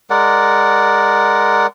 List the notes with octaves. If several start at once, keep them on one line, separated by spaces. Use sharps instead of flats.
G#3 A#4 D5 F#5